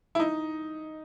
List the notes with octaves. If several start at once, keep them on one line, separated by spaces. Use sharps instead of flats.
E4
D#4